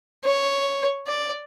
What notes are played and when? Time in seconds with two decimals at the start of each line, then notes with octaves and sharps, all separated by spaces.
0.25 C#5
1.07 D5